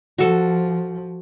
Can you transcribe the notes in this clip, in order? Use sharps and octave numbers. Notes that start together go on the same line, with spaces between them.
F3 F#4 A4